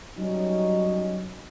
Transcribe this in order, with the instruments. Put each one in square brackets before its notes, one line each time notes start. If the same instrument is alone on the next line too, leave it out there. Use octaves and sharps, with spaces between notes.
[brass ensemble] F#3 G3 C#4 D#4